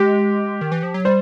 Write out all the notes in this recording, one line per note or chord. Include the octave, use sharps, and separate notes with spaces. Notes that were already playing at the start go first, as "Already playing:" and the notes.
Already playing: G#3 G4
D#3
E3
F3
F#3
G3 C5